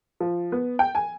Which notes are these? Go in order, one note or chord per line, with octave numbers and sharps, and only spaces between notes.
F3
B3
G5
G#5